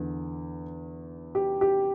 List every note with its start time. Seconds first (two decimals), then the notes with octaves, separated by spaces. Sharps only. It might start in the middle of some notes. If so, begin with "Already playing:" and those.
Already playing: E2 D3
1.35 G4
1.61 G4